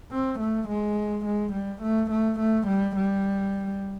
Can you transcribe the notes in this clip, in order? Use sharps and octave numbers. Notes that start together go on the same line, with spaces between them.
C4
A3
G#3
G#3
G3
A3
A3
A3
G3
G3